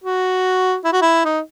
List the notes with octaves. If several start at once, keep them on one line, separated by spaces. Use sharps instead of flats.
F#4
E4
F#4
E4
D#4